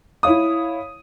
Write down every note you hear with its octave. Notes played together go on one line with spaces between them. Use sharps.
E4 C#5 F5 D#6